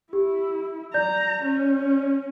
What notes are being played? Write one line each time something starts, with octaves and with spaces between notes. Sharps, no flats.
E4 G4
D5 A#5 G6
C#4